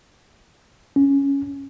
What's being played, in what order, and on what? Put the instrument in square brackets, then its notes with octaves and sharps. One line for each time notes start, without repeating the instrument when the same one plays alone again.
[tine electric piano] C#4